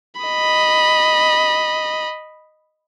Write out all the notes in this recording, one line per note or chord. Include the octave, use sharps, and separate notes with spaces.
D#5 B5